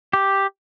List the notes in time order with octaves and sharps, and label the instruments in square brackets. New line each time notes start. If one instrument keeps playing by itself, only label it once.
[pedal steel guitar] G4